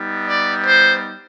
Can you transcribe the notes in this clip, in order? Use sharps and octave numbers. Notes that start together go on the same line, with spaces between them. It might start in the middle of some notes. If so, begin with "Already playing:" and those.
Already playing: G3 B3 D#4
D5
C5